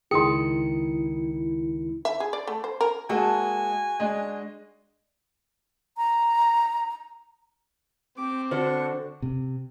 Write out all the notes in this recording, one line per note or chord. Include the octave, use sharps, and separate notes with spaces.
C#2 D#3 E4 G#4 G5 C6 D#6 C#7
E5
G#4
D5
A3
C5
A#4
G#3 A#3 F#4 G#4 A4 G#5
G#3 D4 D#5
A#5
C4 G4 D6
D3 D4 F#4 A4 C5 C#6
C3